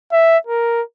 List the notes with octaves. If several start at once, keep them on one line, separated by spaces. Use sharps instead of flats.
E5
A#4